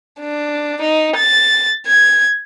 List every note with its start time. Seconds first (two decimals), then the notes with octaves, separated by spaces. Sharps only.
0.20 D4
0.82 D#4
1.16 A6
1.87 G#6